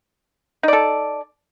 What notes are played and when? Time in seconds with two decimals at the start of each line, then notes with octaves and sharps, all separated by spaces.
0.63 D#4
0.68 D5
0.73 A4